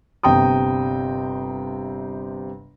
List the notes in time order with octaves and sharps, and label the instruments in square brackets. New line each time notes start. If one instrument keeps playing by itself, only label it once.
[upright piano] G1 C3 G5 A#5 D#6